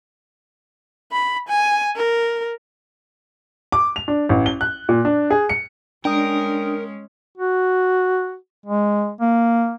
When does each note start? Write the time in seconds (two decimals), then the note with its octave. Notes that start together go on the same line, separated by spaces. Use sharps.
1.12 B5
1.48 G#5
1.96 A#4
3.72 D6
3.96 F7
4.08 D4
4.29 A1
4.46 G7
4.61 F#6
4.89 A#2
5.05 D4
5.31 G#4
5.49 C#7
6.05 G#3 C#4 D4 A#4 G5 D#6
7.38 F#4
8.66 G#3
9.21 A#3